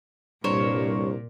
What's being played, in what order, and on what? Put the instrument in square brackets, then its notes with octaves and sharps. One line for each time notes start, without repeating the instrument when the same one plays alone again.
[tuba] C2 [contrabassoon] G2 [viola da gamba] A#2 [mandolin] A#4 C5 C#5